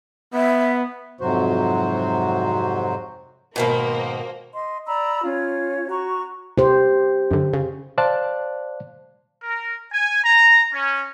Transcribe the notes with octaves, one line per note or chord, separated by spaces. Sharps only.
B3 E5
F2 G#2 C3 F#3 F#4 C5
G#2 B2 D#3 A#3 C5
D#5 C6
D5 A#5 B5 E6
C#4 F4 C#5
F#4 A#5 C#6
C3 G4 C5
F#2 D3
C#3
C5 D5 F5 A5 F#6
A#4
G#5
A#5
C#4